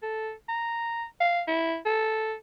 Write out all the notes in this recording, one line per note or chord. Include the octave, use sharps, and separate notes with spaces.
A4
A#5
F5
E4
A4